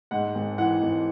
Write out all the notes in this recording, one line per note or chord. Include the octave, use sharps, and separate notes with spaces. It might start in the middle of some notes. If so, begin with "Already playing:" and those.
G#2 F#5
G#1
E3 F#5
G#1